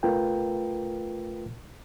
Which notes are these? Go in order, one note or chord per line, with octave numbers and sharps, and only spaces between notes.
A3 F4 A#4 B4 G5